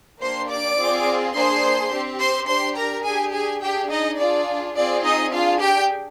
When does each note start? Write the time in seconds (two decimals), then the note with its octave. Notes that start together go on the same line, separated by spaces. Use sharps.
0.21 A#3 D4 G4 C5 C6
0.49 D5 D6
0.78 C4 F4 G#4
1.34 A#3 D4 G#4 C5 C6
1.91 C4 G4
2.19 C5 C6
2.48 D4 G4 C5 C6
2.77 A#4 A#5
3.04 D4 G4 G#4 G#5
3.33 G#4 G#5
3.61 D4 G4 G#4 G5
3.90 D#4 D#5
4.18 D4 F4 G#4 D5
4.75 C4 F4 G#4 D5
5.04 D#4 D#5
5.32 D4 F4 G#4 F5
5.60 G4 G5